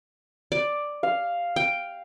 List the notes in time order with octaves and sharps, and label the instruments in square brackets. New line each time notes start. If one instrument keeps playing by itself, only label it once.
[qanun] D5
[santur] F5
[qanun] G5